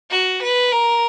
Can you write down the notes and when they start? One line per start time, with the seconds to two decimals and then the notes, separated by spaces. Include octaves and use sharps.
0.11 F#4
0.42 B4
0.71 A#4